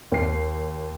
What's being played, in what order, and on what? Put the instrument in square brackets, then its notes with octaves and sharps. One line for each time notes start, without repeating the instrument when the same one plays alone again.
[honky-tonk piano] D#2 C7